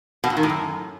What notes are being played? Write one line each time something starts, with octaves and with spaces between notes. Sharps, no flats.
B2
A#2
D#3
A2
F#2